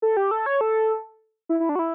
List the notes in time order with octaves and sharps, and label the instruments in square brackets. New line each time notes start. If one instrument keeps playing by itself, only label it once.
[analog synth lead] A4
G4
A4
C#5
A4
E4
E4
D4
F#4
E4